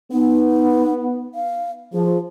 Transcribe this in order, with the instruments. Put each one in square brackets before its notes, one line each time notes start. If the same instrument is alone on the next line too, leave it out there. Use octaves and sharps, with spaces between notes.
[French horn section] B3 [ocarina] D#4
[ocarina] F5
[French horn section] F3 [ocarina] G#4